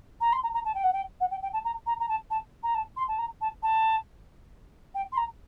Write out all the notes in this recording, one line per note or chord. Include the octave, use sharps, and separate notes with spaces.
A#5
C6
A#5
A#5
A5
G5
F#5
G5
F#5
G5
G5
A5
A#5
A#5
A#5
A5
A5
A#5
A5
C6
A5
A#5
A5
A5
G5
C6
A#5